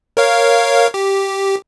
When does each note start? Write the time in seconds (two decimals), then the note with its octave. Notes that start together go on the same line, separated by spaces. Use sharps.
0.17 A#4 C#5 F5
0.94 G4